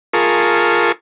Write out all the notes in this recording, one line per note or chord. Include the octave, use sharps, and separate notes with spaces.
F4 G#4 A#4 A5 C#6